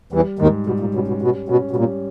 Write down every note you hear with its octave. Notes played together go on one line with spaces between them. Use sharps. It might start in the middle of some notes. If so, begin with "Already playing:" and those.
E2 E3 G3
D#2 G#2 D#3
B2 G3
A#2
B2 C#4
B2
B2 G3
B2 C#4
B2
A#2 G3